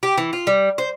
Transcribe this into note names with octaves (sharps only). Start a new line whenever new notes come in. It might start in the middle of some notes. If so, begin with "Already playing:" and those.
G4
E3
F4
G3
C5